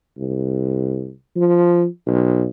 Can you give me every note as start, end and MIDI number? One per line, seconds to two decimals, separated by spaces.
0.18 1.11 36
1.36 1.86 53
2.07 2.46 35